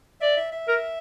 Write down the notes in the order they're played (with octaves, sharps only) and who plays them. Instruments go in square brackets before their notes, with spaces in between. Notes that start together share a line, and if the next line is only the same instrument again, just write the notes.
[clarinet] D5 [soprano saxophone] E5
[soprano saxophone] E5
E5
[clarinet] A#4